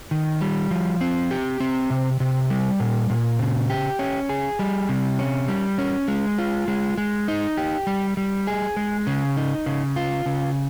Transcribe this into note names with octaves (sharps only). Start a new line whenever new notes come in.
D#3
G3
F3
C4
G4
C4
C3
C3
G3
A#2
A#2
C#3
G4
C#4
G#4
G3
C3
C#4
G3
C#4
G#3
F4
G#3
G#3
D#4
G4
G3
G3
G#4
G#3
C#3
D#4
C#3
F4
C#3